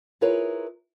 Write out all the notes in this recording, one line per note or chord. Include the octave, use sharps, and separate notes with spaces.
E4 F4 G#4 A#4 B4 C#5